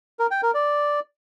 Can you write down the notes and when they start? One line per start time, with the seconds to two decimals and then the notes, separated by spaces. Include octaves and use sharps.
0.19 A#4
0.31 G5
0.43 A#4
0.54 D5